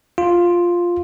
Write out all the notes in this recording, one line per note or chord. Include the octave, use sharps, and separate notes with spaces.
F4